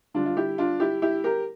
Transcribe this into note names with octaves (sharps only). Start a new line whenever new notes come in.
D3 G3 D4 F4
F4
E4 G4
D4 F4
E4 G4
E4 G4
G4 A#4